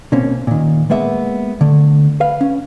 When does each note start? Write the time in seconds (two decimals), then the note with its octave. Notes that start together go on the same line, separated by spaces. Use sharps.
0.12 B2 A#3 C4 C#4
0.47 A#2 D#3
0.90 G#3 A#3 B3 E5
1.61 D3 A3
2.20 B4 F5
2.41 C#4